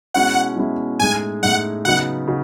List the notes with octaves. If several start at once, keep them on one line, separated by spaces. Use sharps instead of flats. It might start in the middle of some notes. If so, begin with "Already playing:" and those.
B2 G#3 C#4 E4 F#5
B2 G#3 C#4 E4
A2 G#3 D#4 G#5
A2 G#3 D#4 F#5
C#3 F#3 B3 D#4 F#5
C#3 F#3 D#4